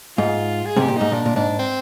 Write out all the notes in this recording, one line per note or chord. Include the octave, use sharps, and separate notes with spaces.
G#2 F4
G#4
G#2 C3 G4
A#2
G#2 D#4
A#2 D4
A#2
G#2 D4
C4